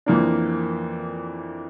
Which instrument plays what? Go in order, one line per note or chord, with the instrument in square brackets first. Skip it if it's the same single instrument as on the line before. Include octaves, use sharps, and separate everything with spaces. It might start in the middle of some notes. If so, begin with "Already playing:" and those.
[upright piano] F2 E3 A#3 D4